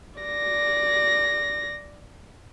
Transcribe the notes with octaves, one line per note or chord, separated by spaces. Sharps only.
D5 A#6